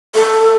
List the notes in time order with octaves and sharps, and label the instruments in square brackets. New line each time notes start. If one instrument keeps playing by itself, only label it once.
[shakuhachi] A4